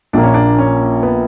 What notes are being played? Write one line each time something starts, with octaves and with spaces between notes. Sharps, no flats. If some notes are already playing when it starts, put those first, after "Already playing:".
A#1 A#2 A#3 D4
C#4
D4
C#4
B3